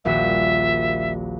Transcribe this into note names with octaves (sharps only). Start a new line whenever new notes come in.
D#1 A#1 F#4 E5